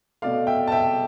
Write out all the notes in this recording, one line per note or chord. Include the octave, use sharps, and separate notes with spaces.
B2 A3 D5 F5
E5 G5
A5
E5 G5